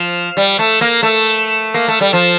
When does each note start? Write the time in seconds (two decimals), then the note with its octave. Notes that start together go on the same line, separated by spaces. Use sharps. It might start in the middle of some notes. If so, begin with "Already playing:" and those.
Already playing: F3
0.37 G3
0.59 A3
0.81 A#3
1.03 A3
1.74 A#3
1.88 A3
2.01 G3
2.13 F3